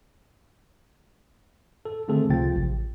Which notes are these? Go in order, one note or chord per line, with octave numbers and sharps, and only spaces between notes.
A4
D3 D#3 A3 C4 G#4 A4
C#2 C3 F3 F4 G5 A6
A1